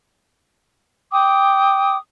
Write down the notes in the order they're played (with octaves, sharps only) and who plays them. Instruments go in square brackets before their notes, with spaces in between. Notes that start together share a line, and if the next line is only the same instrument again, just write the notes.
[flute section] G5 D6 D#6